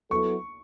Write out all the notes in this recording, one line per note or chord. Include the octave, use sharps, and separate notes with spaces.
F#3 B3 E4 A4 C#6